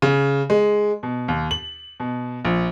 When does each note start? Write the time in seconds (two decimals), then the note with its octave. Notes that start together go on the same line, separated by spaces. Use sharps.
0.02 C#3
0.50 G#3
1.03 B2
1.28 D#2
1.51 F#7
2.00 B2
2.45 A#1